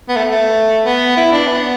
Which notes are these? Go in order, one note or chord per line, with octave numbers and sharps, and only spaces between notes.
B3
A3
A3
B3
E4
D4
B3